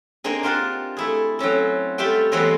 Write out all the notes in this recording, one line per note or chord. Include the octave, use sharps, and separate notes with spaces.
A#3 C4 D4 D#4 G#4
D4 F4 G4 A#4 F#5 A5
A3 E4 G#4
F#3 C4 C#4 A4
G3 A3 F4 G4 E5 G5
E3 F#3 G#3 A3 B3 C4